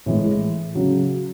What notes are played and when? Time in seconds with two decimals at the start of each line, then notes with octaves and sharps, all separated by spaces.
0.06 A2 E3 G#3
0.75 C#3 F#3